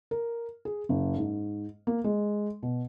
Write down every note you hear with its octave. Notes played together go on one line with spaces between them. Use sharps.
A#4
G#4
F#1
G#2
A#3
G#3
B2